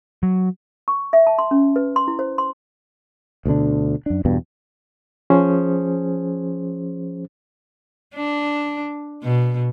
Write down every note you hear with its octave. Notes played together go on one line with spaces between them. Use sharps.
F#3
C#6
E5
A5
C6
C#4
B4
C6
E4
C5
C6
D2 B2 D3 D4
F#2 D4
E2 G2 B2
F3 C#4 G#4 C5
D4
B2